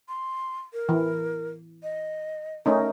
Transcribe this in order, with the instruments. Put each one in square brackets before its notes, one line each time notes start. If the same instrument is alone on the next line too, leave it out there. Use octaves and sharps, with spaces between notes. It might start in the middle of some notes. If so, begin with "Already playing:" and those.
[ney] C6
A#4
[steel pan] E3
[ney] D#5
[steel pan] A3 C#4 D#4 [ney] A#4